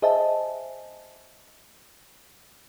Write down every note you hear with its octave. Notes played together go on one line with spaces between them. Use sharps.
G#4 C5 D#5 E5 G#5 A5